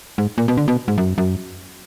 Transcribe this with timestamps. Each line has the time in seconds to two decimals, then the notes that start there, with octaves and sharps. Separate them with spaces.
0.18 G#2
0.38 A#2
0.48 B2
0.57 D3
0.68 B2
0.88 G#2
0.98 F#2
1.18 F#2